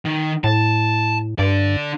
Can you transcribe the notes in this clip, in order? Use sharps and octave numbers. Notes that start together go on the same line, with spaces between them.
D#3
A2 A5
G2 D3 D5